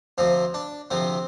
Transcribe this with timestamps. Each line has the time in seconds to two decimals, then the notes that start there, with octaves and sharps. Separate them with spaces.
0.18 D2 C3 F3 C4
0.54 D4
0.91 D2 C3 F3 C4